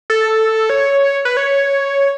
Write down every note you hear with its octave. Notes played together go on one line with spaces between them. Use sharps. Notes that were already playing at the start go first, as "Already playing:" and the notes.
A4
C#5
B4
C#5